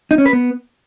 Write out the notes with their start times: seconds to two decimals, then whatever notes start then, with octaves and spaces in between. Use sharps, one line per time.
0.11 D#4
0.18 C#4
0.26 B4
0.33 B3